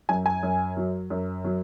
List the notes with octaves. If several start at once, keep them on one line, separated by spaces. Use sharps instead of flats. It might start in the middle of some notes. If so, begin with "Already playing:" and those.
F#2 G#5
G#5
F#2
F#3
F#2
F#3